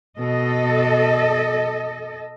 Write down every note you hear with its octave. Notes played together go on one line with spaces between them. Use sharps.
B2 A4 D#5